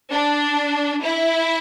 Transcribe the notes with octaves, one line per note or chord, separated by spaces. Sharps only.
D4
E4